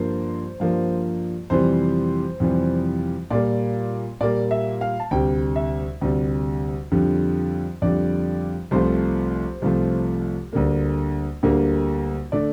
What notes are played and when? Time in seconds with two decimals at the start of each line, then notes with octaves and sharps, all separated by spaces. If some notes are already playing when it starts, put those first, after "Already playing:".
Already playing: G2 F3 A#3 C5
0.60 G2 F3 A#3
1.50 F2 C3 E3 G3 C5
2.40 F2 C3 E3 G3
3.30 A#2 G3 A#3 D5
4.21 A#2 G3 A#3 D5
4.51 E5
4.81 F5
5.00 A5
5.11 D2 C3 G3 G5
5.56 E5
6.01 D2 C3 G3
6.92 F2 D3 G3
7.82 F2 D3 G3 D5
8.71 C2 C3 F3 A3 C5
9.62 C2 C3 F3 A3
10.53 D2 D3 G3 A#3
11.43 D2 D3 G3 A#3
12.32 D3 A3 D5